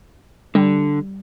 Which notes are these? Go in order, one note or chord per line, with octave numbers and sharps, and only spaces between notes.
D3 G3